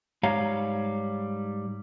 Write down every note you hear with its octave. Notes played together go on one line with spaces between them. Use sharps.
G#2 G3 C#5 F5 A#5